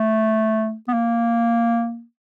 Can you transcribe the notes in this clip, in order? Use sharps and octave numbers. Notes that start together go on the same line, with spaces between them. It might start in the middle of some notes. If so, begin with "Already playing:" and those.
Already playing: A3
B3
A#3